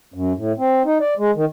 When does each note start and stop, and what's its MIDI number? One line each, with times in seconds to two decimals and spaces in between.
0.14 0.33 42
0.37 0.52 45
0.58 0.83 60
0.85 0.98 63
1.01 1.14 74
1.18 1.31 56
1.36 1.45 51